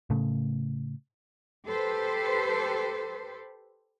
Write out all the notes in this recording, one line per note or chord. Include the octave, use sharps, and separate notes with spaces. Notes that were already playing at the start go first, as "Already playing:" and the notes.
A2 C#3 A3
G4 A4 B4 C5